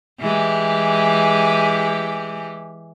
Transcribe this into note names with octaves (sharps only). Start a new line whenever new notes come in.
E3 G#3 G4